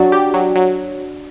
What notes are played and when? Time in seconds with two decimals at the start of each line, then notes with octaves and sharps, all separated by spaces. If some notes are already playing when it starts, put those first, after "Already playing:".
Already playing: F#3 D4 F#4
0.12 G4
0.34 F#3
0.55 F#3